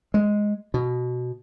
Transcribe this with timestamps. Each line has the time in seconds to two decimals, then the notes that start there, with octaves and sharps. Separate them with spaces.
0.14 G#3
0.74 B2